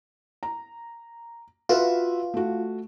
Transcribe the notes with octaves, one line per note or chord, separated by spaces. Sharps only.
A#5
F4 F#4 B4 E5
A3 F#4